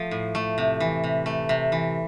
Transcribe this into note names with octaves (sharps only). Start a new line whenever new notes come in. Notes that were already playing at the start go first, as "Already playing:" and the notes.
Already playing: F3 A3
A2
A3
C3
E3
C3
A3
C3
E3